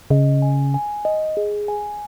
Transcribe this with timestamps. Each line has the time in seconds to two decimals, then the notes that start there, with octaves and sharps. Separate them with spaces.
0.10 C#3 D#5
0.42 G#5
0.74 G#5
1.05 D#5
1.37 G#4
1.68 G#5